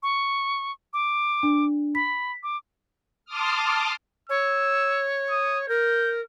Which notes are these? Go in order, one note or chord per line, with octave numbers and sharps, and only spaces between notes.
C#6
D6
D4
B5 B6
D6
A5 C6 D6 D#6 F6
C#5 E6
D#6
A#4 G6